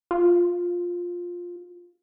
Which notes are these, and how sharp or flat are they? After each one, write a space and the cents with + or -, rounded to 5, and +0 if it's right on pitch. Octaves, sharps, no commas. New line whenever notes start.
F4 +10